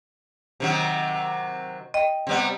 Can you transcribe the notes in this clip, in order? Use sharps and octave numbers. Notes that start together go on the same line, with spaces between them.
C3 D#3 F#3
D#5 G5
C3 G3 B3